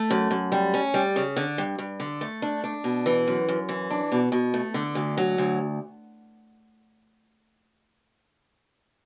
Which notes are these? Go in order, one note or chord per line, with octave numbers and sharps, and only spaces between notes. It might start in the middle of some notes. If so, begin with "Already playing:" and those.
Already playing: A3
F#2
F#2
G3
C#4
G3
C#3
D3
G2
G2
D3
A3
D4
D4
B2
E3
F#2
F#2
E3
D4
B2
B2
A3
D3
D2
F#3
D2